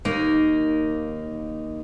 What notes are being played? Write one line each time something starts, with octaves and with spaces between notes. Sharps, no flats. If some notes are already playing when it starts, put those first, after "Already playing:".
D#2 A#3 D#4